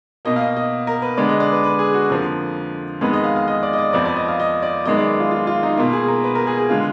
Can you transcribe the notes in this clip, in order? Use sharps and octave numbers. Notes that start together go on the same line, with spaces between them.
B2 A#3 D#5
F5
D#5
D#5
A#4
B4
D3 G#3 B3 D5
D#5
D5
B4
B4
G#4
F#4
F2 D3 F3 A#3
F2 D#3 G#3 B3 B4
D#5
F5
F5
D#5
D5
D#5
D5
F2 F3 B3 D5
D5
D#5
F5
D#5
D5
F#2 D#3 G#3 B3 D#5
D5
F4
F4
F4
D#4
B2 A#3 F4
G#4
A#4
B4
A#4
G#4
G#4
D3 G#3 F4